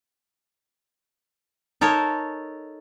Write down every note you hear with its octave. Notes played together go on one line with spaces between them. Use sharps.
D#4 A4 A#4 C#5